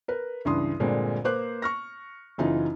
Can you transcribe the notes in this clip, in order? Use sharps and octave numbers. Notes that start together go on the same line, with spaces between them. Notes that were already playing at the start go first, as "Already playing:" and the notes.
A#4 B4
C#2 G2 E3 C6 D#6
G2 A#2 D3 G#3 C4
A#3 B4 C5 D6 F#6
C#6 F6 A#6
F#1 E3 D#4 F4